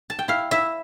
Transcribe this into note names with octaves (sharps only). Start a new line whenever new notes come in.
A5
G5
E4 F5
E4 E5